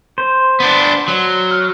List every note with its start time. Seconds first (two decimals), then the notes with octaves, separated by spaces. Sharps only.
0.18 C5
0.60 B3 D4
1.08 F#3
1.51 F6